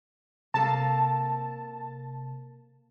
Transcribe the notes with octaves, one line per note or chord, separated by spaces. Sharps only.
C3 A#3 A4 A#4 A5